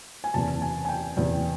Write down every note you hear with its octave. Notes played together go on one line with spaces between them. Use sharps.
G#5
F#1 E2 C3 A5
G#5
G#5
G5
F#1 E2 C3